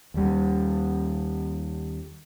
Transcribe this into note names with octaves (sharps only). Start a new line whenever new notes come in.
D#2 G3